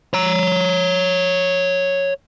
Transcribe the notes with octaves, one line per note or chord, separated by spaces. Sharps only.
C#5 A#5